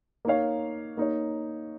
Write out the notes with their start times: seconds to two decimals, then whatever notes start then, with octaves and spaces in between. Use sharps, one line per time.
0.25 A#3 D#4 C#5 F5
0.97 A#3 D#4 C#5